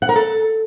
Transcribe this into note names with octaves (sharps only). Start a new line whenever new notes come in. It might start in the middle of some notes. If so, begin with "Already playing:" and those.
F#5
A#4
A4